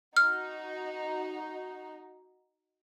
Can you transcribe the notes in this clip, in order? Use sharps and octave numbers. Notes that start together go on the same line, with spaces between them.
D#4 F#4 F6